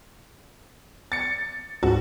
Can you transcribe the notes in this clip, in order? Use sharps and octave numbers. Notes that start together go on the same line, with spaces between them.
A6 C#7
C#2 G#2 F#4